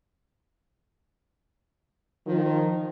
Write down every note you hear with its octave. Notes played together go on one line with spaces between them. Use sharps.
D#3 F3